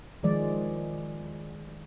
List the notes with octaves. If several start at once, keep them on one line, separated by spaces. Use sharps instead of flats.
D#3 F3 G#3 D5